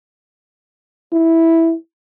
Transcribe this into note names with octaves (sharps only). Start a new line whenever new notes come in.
E4